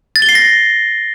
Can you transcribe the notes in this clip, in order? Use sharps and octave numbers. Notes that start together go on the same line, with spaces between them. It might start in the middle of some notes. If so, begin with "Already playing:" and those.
A6
G7
C7
A#6